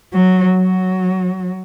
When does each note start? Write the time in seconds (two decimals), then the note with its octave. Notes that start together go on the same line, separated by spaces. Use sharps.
0.14 F#3
0.56 F#3